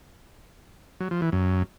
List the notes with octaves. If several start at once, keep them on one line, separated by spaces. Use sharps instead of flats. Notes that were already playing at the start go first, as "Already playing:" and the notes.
F#3
F3
E3
F#2